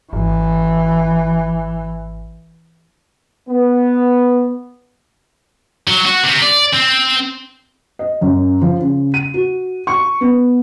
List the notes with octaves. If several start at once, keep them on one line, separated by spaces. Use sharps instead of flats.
G#1 E3
B3
F#3
F#4
C3
D5
C4
D#5
F#2
F3
C#3
D#7
F#4
C#6
B3